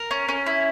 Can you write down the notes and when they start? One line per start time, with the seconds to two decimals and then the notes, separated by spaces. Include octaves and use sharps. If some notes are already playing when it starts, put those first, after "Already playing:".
Already playing: A#4
0.11 C#4
0.29 C#4
0.46 E4